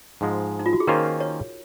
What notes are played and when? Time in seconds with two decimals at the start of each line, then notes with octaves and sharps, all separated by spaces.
0.21 G#2 F3 G#3
0.59 D#4
0.66 F4
0.73 F#4
0.80 G#4
0.87 D#3 A#3 C#4 F4 A#4 C5
1.20 C#5